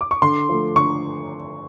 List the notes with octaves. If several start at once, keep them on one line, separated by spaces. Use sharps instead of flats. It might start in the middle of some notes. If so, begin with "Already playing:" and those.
D6
C#6
D3 C6
F3 A3
D3 C#6